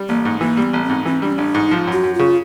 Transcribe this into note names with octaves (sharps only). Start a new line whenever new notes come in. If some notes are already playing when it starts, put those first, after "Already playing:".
Already playing: G3
A1 A#3
G#2
E3 A#3
G3
B3
A1
C4
G#2
E3 C4
G3 D4
C#4
A1 D4
G#2 D#4
F3
F#2
F#4
F#2
F4
C#3